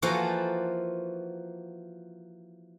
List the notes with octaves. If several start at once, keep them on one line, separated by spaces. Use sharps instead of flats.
E3 F3 A#3 F#4 A4 C5